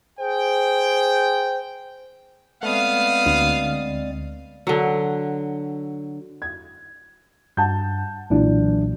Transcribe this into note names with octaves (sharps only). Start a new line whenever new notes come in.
G#4 C5 G5
G#3 A3 B3 C4 D5 F5 D#6
D2
D3 F#3
G#6
G2 F#5 A5 G6
B1 A#2 E3 F#3 D4